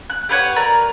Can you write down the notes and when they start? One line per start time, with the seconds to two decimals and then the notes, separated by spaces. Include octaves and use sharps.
0.10 F#6
0.29 G4 B4 C#5 F#5
0.56 A#4 D5 A#5